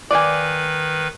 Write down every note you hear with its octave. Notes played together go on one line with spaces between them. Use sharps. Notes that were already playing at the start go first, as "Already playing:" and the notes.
D#3 B4 D5 F5 G#5